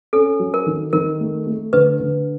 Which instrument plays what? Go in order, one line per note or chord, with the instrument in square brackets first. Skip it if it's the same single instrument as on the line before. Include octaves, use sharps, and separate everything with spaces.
[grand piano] C#4 [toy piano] A4
[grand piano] F#3
[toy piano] A#4
[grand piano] D#3
[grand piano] D#3 [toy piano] A#4
[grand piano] A3
A3
[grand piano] D3 [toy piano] B4
[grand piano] D3